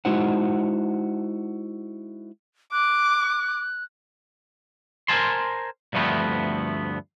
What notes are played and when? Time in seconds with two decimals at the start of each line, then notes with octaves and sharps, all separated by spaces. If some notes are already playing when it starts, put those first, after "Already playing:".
0.05 G#3 D#4 E4 F#4 C5 F#5
2.72 D6 F#6
5.08 A#4 C5 E5 G#5 A5 C6
5.93 D2 G2 F3 A3 B3 C4